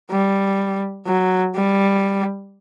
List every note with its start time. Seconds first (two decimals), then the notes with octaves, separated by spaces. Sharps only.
0.11 G3
1.07 F#3
1.55 G3